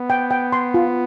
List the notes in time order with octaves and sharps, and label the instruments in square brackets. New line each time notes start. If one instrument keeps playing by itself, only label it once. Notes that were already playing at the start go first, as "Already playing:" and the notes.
Already playing: [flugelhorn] B3
[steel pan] G5
G5
C6
F4